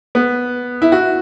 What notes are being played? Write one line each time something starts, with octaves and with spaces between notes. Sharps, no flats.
B3
E4
F#4